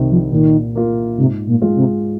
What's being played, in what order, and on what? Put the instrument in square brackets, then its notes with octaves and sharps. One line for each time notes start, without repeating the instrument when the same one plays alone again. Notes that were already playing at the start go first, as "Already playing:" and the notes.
Already playing: [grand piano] C2 C3 D#3
[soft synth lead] F3
[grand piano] A#2 [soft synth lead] D#3
[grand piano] A#3 F4
[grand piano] G#2 [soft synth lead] C3
[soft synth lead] A#2
[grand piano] G#3 F4
[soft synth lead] C3